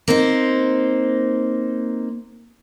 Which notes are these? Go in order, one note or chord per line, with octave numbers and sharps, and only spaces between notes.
A#3 C4 D#4 C5